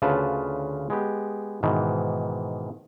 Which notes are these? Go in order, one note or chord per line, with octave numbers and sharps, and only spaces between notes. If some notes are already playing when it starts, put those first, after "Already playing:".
D2 C#3 F4 B4 A5
G#3 B3 G4
G#2 B2 D#3 E3